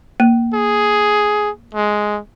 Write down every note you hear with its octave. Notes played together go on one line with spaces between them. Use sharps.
A#3
G#4
G#3